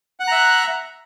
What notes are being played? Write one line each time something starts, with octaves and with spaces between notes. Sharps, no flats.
E5 F#5 A#5 F#6